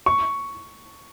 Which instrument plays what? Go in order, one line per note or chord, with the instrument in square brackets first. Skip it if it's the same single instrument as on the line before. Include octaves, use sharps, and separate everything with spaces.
[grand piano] C#6